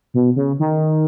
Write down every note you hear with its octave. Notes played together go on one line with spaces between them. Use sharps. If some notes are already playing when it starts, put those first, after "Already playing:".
B2
C#3
D#3